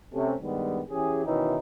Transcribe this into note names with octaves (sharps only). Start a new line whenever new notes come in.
C3 A3 C#4
G2 D#3 G3 G#3 B3
E3 C#4 G4 G#4
B2 D#3 E3 C#4 D#4 E4